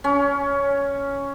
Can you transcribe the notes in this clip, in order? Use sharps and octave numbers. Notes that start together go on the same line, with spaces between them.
C#4